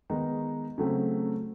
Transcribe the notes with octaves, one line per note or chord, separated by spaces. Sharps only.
D#3 G#3 B3 D#4
C#3 F#3 A3 C4